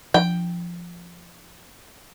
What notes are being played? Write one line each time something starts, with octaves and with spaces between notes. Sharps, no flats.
F3 D4 G5